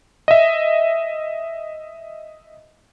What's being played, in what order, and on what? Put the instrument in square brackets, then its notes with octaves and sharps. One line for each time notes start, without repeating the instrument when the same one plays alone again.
[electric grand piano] D#5 E5